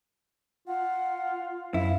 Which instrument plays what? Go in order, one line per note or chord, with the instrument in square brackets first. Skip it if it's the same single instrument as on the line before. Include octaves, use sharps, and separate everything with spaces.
[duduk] F4 [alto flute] F#5
[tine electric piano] F#2 [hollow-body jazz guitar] E4 [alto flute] F5